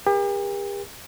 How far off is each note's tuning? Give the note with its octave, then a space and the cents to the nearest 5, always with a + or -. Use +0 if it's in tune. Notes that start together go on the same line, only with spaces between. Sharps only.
G4 +40 A#4 +35